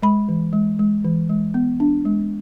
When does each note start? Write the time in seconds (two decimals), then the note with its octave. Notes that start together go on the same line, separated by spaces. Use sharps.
0.02 G#3 B5
0.29 E3
0.53 G#3
0.79 G#3
1.04 E3
1.29 G#3
1.54 B3
1.80 D4
2.05 G#3